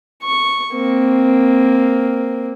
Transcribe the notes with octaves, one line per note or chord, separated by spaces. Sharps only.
C#6
A#3 C4